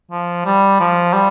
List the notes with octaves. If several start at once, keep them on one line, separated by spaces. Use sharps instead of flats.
F3
G3
F3
G3